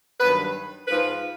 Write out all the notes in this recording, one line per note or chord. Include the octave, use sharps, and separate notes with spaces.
G2 D#3 F#3 B4
G#2 F3 B4